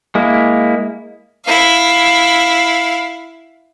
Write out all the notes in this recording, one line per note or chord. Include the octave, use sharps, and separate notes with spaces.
G#3 A#3 E4
E4 F5